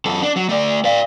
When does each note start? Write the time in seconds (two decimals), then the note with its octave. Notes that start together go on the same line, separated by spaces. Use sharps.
0.06 F#2 A4
0.23 D4
0.36 F#3
0.49 A3 D5
0.85 D5 F5